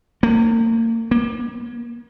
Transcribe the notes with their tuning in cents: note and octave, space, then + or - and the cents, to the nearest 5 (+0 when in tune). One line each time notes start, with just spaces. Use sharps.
A#3 -35
A#3 +35